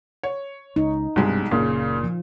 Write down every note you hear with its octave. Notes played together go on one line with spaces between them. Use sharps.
C#5
C#2 D#4
B1 G2 C3 G3 G#3
F#1 A#2 C#3 A#3
F3